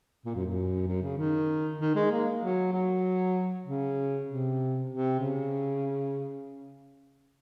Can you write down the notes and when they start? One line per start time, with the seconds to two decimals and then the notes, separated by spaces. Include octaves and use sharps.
0.25 A#2
0.36 F#2
0.46 F#2
0.87 F#2
1.03 C#3
1.18 D#3
1.79 D#3
1.95 G#3
2.11 A#3
2.42 F#3
2.73 F#3
3.66 C#3
4.28 C3
4.90 C3
5.20 C#3